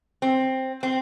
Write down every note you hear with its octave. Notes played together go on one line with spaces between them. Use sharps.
C4
C4